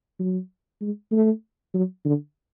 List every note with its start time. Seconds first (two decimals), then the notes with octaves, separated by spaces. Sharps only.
0.19 F#3
0.81 G#3
1.12 A3
1.74 F#3
2.05 D3